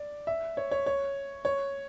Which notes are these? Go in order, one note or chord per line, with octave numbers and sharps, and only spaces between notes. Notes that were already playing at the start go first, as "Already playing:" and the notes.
Already playing: D5
E5
C#5
C#5
C#5
C#5